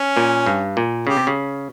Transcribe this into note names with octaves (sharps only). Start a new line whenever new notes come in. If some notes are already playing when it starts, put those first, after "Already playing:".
Already playing: C#4
A#2
G2
A#2
C#3 G4
C3
C#3